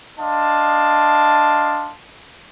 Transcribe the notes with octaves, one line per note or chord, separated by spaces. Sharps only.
D4 D#5 F5 A5 C6